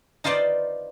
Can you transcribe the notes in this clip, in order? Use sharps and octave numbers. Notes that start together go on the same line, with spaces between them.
D#4 F4 B4 C5 D5